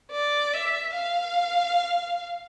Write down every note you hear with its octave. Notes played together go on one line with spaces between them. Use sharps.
D5
E5
F5